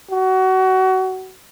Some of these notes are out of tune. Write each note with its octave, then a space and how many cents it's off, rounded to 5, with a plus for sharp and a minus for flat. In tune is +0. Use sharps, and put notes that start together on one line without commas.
F#4 +25